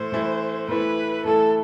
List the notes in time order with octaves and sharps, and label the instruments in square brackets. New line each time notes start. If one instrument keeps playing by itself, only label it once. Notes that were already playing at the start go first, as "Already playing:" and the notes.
Already playing: [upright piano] A2 E3 A3 E4 [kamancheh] C5
[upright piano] A2 E3 A3 E4
[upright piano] A2 E3 A3 E4 [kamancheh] B4
[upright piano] A2 E3 A3 E4 [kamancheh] A4